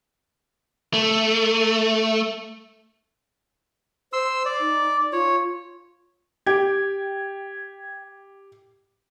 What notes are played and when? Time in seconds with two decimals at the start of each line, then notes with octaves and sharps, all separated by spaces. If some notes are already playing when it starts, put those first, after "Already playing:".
0.94 A3
4.13 C5 C6 E6
4.45 D5
4.60 D#4
5.13 F4 C#5
6.46 G4 G5 G#6